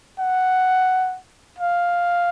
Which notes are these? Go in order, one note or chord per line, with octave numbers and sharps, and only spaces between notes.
F#5
F5